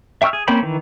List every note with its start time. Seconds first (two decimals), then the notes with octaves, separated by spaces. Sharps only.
0.22 E5 G5 C#6 E6 F6
0.33 G#4
0.48 A#3 C4 C#4 G5 B5
0.62 D#3 E3